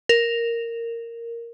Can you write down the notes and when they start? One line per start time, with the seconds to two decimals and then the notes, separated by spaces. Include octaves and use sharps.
0.09 A#4